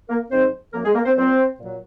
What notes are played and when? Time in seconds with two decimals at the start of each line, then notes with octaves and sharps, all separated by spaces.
0.09 A#3 A#4
0.31 G#2 D#3 F#3 C4 C5
0.73 F#2 F3 A#3 A#4
0.85 G#3 G#4
0.95 A#3 A#4
1.05 C4 C5
1.16 A#2 F#3 C4 C5
1.59 A#2 F#3